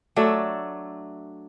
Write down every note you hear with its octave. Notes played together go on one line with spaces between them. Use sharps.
F#3 A3 D4 E5